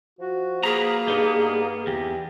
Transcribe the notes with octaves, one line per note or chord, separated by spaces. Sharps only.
F3 F#4
A#3 G#4 A#4 B4 A#5
G2 B3 D#4
E2 G4